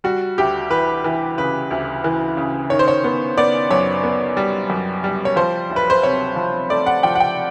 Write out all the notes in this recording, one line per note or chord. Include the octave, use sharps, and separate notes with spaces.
G3 F#4
D2 G4
E3 B4
E3
C#3 B4
D2
E3
C#3
D#3 C#5
C5
C#5
B3
B3 D5
F#2 C#5
B3
G3
F#2
G3
C#5
F3 C5
D2
B4
C5
C3 C#5
F3
A3 D5
F#5
F3 G5
F#5
G5